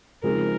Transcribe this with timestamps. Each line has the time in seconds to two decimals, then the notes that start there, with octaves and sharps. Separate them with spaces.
0.23 C#3 F3 G#3 C4 D#4 A#4